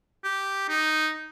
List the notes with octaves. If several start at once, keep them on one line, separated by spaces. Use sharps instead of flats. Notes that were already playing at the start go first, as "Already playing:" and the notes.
G4
D#4